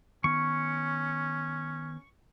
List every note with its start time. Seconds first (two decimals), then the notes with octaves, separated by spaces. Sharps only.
0.24 D#3 B3 C#4 C#6